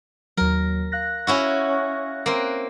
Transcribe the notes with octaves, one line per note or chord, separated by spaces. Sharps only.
D#2 F#3 A#4
F5 F#6 A#6
C#4 E4 F#4
A#3 C4